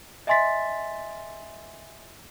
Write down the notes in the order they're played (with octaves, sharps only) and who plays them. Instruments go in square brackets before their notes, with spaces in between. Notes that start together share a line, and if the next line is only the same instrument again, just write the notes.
[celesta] D#5 E5 G#5 C6 A6 B6